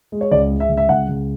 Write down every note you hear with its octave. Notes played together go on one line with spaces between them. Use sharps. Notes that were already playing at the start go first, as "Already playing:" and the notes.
G#3
C#5
C#2 D5
G#3
E5
C#2
E5
C#2 F#5
C#2